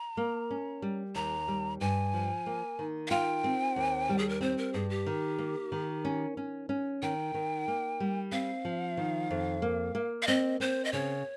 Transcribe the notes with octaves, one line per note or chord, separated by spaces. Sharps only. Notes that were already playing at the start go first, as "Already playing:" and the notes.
Already playing: A#5
A#3
C#4
G3
D#2 A#5
G3
G2 G#5
F3
A#3
D#3
F5
F4 G5
C4
D#2
G3
G#4
A#4
C4 C5
A#4
G2 G#4
G4
D#3
A#3
D#3
C#4
C#4
C#4
D#3 G5
D#3
A#3
G3
C4 F5
F3
D#3
F2
A#3
A#3
F5
C4 D#5
C4 C5
D#5
C#3 C#5